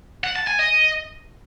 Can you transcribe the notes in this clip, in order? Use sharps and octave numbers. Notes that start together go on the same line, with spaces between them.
F#5
A5
G#5
D#5